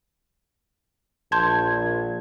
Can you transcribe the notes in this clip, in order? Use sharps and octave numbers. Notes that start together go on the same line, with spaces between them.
A#1 A5 C6 G6 G#6